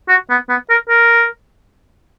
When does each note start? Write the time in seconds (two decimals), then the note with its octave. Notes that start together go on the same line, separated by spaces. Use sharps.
0.09 F#4
0.30 B3
0.49 B3
0.70 A#4
0.89 A#4